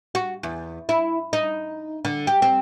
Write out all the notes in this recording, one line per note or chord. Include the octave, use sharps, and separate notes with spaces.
F#4
E2
E4
D#4
D3
G4
C4